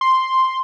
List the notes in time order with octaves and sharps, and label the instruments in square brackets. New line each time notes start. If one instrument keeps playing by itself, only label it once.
[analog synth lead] C6